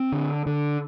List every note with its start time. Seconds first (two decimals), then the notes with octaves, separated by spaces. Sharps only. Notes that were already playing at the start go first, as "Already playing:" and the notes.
Already playing: C4
0.12 D3
0.46 D3